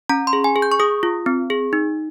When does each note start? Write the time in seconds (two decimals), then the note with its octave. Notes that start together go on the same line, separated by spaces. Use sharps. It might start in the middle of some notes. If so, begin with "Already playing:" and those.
0.09 C#4 A#5
0.27 C6
0.33 G#4
0.44 G#5
0.56 G#4
0.62 G6
0.72 C#6
0.80 G#4 D#6
1.03 F4
1.26 C4
1.50 G#4
1.73 D#4